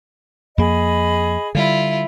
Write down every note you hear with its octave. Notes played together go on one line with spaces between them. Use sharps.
F2 A#3 G#4 D#5 B5
D3 G3 E4 F4